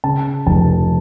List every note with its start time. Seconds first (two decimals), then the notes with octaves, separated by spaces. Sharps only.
0.04 C#3 A5
0.46 F1 A5